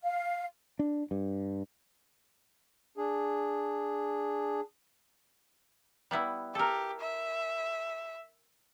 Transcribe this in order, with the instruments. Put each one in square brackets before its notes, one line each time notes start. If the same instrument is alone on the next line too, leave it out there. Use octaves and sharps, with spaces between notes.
[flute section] F5
[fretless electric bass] D4
G2
[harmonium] D4 G#4
[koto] G3 B3 E4
[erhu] G4 [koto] A4 A#4
[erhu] E5